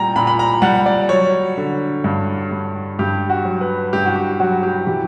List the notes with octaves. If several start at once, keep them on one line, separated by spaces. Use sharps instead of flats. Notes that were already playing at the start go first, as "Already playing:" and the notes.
Already playing: A#2 G3 G5 A#5
A#2 B5
B5
A#5
G3 F#5
D5
F#3 C#5
D3
G2
G2
G2 G4
F#4
F#3
B4
G2 G4
F#4
G4
F#3 F#4
G4
E3 G4